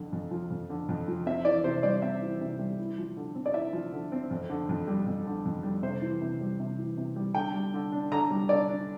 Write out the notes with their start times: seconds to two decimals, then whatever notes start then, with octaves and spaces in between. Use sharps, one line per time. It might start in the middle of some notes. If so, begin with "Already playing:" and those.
Already playing: F2 D3
0.12 F2
0.31 F3
0.50 F2
0.70 D3
0.89 F2
1.08 F3
1.26 C4 E5
1.45 E3 D5
1.64 C3 C5
1.83 G3 D5
2.02 C4 E5
2.22 E3
2.41 C3
2.59 G3
2.79 E4
2.98 F3
3.17 D3
3.35 C4
3.46 D5
3.54 E4 E5
3.73 F3
3.92 D3
4.12 C4
4.31 F2
4.50 D3
4.69 F2
4.88 G3
5.06 F2
5.26 D3
5.45 F2
5.63 G3
5.82 C3 C5
6.02 E3
6.21 C3
6.41 G3
6.60 C3
6.78 E3
6.97 C3
7.16 G3
7.35 D3 G5
7.54 G3
7.74 D3
7.92 D4
8.12 D3 A#5
8.31 G3
8.49 D3 D5
8.68 D4